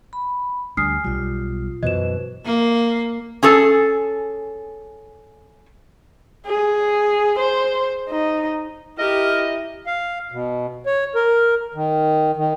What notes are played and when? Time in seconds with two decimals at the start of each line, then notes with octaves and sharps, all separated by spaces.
0.13 B5
0.77 D2 G3 D4 G#5 D#6 F6 C7
1.04 B1 G3 F4
1.83 F#2 B2 E3 F#4 B4 C5 D#5 E7
2.46 A#3
3.43 C#4 G#4 A4
6.47 G#4
7.39 C5
8.10 D#4
8.99 E4 G4 A#4 D#5
9.87 F5
10.32 B2
10.86 C#5
11.15 A#4
11.75 D#3
12.37 D#3